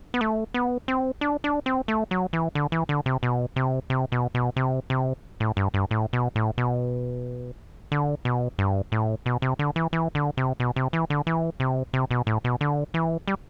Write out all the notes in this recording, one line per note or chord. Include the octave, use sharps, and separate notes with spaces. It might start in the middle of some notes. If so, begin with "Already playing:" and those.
B3
A3
B3
C4
D4
D4
C4
A3
F#3
E3
D3
E3
D3
C3
B2
C3
C3
B2
B2
C3
C3
A2
G2
G2
A2
B2
A2
B2
D3
B2
G2
A2
B2
C3
D3
E3
E3
D3
C3
B2
C3
E3
D3
E3
C3
C3
B2
A2
B2
D3
E3
G3